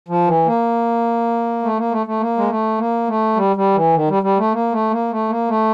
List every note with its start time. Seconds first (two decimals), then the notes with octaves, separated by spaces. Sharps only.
0.08 F3
0.27 E3
0.46 A#3
1.62 A3
1.77 A#3
1.91 A3
2.06 A3
2.20 A#3
2.37 G#3
2.49 A3
2.78 A#3
3.08 A3
3.36 G3
3.56 G3
3.75 E3
3.94 D#3
4.09 G3
4.23 G3
4.38 A3
4.53 A#3
4.72 A3
4.91 A#3
5.11 A3
5.29 A#3
5.48 A3